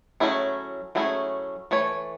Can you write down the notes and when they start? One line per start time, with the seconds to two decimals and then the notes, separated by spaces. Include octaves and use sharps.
0.20 F#3 A3 C#4 E4 G#4
0.95 F#3 A3 C#4 E4 G#4
1.71 E3 A3 C#5